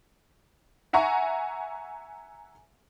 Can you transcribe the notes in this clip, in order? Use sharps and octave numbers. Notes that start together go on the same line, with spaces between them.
E5 F#5 G#5 A#5 C#6